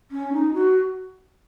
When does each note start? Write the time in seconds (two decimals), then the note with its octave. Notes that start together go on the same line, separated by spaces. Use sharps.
0.11 C#4
0.33 D#4
0.54 F#4